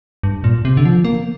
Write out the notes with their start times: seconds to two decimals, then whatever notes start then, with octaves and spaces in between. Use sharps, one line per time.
0.23 G2
0.44 A#2
0.65 C3
0.77 D3
0.85 F3
1.04 A#3